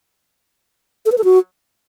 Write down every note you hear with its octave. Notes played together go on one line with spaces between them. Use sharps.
A4
B4
A4
F#4